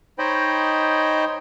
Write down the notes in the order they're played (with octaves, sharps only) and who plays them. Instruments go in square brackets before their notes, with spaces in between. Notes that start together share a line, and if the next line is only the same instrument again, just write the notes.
[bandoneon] D#4 C5 C#5 D#5 G5 B5